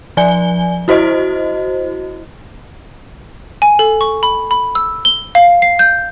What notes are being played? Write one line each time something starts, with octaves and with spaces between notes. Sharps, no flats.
F3 D5 G#5 G7
E4 F#4 C5 D#5
G#5
A4
C#6
B5
B5
E6
G7
F5
C7
G6